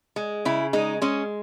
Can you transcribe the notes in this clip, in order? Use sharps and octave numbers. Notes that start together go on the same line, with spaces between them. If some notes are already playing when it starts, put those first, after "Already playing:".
G#3
C#3 E4
G#3 D#4
G#3 C#4